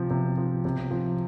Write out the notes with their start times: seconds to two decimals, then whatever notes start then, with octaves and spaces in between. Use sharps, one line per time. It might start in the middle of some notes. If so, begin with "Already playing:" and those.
Already playing: C3 F3
0.10 C3
0.38 F3
0.65 C3
0.91 F3